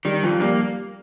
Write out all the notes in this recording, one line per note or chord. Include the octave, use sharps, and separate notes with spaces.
D#3 G3
F2 F3
G3 A#3